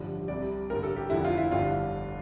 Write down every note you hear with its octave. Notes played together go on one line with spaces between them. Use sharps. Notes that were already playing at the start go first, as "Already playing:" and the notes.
Already playing: A1 G2 D3 F3
C2 C3 G3 D5
A1 G2 D3 A#4
A4
G4
F1 F2 D3 F3 E4
F4
E4
G1 G2 D3 F4